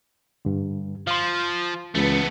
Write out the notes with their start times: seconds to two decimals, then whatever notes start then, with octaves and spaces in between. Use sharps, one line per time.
0.45 G2 D3
1.07 F3 F5 C6
1.95 C#2 E3 A3 B3 B4